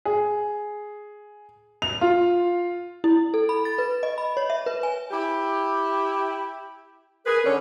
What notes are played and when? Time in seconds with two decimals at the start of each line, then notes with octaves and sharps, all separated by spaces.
0.05 G#4
1.82 F7
2.01 F4
3.04 E4
3.34 A4
3.49 B5
3.65 A6
3.78 B4
4.03 D#5
4.18 B5
4.37 C#5
4.50 E5
4.66 B4
4.83 G#5
5.11 E4 G4
7.26 G#4 A#4 B4
7.45 D3 C#4 C#5